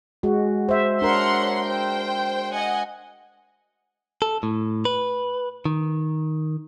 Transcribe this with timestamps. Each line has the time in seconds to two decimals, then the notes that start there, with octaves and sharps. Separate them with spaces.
0.23 G#3 F#4
0.69 C5 E5
1.02 D4 A#4 C#5 F#5 C6
1.64 C5 G5
2.53 D#5 F#5 G#5
4.22 A4
4.43 A2
4.85 B4
5.65 D#3